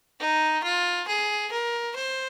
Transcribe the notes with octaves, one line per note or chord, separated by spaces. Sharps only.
D#4
F4
G#4
A#4
C5